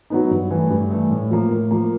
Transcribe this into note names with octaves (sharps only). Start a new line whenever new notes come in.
F#3 B3 D#4
G2
E3 A3
G2
E3 A3
A2
F3 A#3
A2
F3 A#3